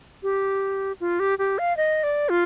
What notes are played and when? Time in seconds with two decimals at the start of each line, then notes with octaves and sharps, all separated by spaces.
0.23 G4
1.00 F4
1.20 G4
1.39 G4
1.59 F5
1.77 D#5
2.03 D5
2.29 F4